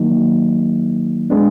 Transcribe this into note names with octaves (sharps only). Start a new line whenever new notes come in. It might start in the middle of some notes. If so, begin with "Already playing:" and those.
Already playing: D#3 F#3 A#3 D#4
G#3 B3 D4